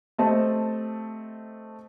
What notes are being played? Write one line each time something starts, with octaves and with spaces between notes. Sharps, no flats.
A3 C4 G4 D#5 A5